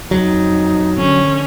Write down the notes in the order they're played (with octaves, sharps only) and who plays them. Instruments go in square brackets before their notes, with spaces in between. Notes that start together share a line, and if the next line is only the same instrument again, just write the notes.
[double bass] F2 D#4 [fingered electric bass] F#3
[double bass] D3 F3 [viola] C#4